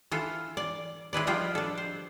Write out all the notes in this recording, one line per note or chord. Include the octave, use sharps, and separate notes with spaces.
E3 F4 A4
D5
G#3 E4 B4 D5
F3 G3 F4 G5
D4 A4
C5